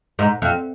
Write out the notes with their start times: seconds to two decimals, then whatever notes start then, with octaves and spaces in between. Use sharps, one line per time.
0.19 G#2
0.42 F2